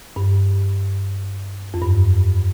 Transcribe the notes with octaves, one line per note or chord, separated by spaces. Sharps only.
G2
F2
G2